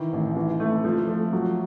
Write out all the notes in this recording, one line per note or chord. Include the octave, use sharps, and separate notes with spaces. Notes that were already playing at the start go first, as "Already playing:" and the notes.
Already playing: D#3 E3
A1
E3
A3
F3
A3
F#3